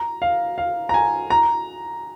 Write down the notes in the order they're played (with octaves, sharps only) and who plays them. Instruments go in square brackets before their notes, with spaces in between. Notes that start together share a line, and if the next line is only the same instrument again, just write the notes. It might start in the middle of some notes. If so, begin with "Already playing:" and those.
Already playing: [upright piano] A#5
F5
F5
A#5
G#5
A#5